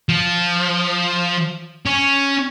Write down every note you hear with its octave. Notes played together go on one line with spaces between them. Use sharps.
F3
C#4